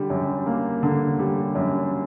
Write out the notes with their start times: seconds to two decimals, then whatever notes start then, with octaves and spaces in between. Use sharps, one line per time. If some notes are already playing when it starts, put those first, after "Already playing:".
Already playing: D3 G3
0.10 F#2
0.46 A#3
0.83 D3
1.19 G3
1.55 F#2